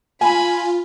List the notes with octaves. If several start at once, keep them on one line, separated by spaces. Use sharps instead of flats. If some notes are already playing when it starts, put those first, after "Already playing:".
F4 G#5 B5